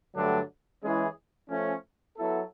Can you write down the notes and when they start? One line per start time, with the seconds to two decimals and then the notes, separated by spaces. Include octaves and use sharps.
0.15 G2 D3 F#3 A3 D4
0.83 E3 G#3 C#4 E4 G#4
1.49 F3 A3 C#4
2.17 F#3 B3 E4 A4